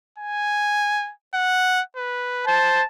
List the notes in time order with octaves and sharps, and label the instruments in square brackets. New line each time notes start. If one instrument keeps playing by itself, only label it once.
[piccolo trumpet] G#5
F#5
B4
[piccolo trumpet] C5 [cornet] A5